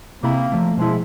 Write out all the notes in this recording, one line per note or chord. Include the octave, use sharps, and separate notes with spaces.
C3 A#3 E4 B5
F3 A3
B2 F3 G#3 E4